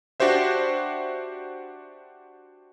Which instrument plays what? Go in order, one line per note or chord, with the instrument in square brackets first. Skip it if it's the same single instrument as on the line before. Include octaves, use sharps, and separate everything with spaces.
[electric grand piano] D4 F#4 G4 C5 E5